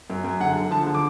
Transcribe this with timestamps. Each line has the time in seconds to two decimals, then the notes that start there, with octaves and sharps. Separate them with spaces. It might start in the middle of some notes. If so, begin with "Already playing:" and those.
0.10 F#2
0.24 F#2
0.40 D3 F#5
0.56 D3
0.71 F3 A5
0.86 D3
0.94 D6